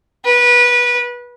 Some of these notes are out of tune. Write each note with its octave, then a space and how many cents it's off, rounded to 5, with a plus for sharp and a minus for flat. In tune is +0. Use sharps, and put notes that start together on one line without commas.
B4 -20